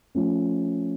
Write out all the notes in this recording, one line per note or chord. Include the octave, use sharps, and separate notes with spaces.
F3 A3 C#4